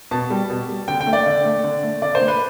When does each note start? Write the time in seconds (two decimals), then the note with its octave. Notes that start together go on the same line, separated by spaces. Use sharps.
0.11 B2 A5
0.30 G3
0.50 B2
0.69 G3
0.88 D3 G5
1.01 G5
1.07 A3
1.13 D5
1.26 D3
1.45 A3
1.64 D3
1.83 A3
2.02 D3 D5
2.15 C5
2.21 A3
2.28 B4